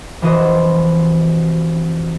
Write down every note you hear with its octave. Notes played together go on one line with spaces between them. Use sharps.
F1 E3 F#4 D#5 C6 E7